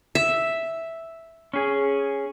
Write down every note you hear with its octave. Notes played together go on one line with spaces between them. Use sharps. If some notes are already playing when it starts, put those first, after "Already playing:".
E5
C#4 G#4